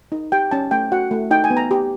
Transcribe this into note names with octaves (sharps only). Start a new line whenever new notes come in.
D#4
G4 G5
C#4 A5
A3 G5
F#4 F#5
A3
D#4 G5
G#5
B3
A#5
G4